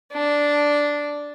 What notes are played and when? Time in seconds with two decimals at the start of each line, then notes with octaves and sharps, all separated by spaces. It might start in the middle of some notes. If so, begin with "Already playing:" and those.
0.13 D4